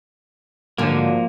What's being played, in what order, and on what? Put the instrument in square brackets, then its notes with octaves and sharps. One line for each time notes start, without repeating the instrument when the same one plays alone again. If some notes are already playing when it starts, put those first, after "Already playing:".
[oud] G#2 D3 F#3 [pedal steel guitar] F3 A#3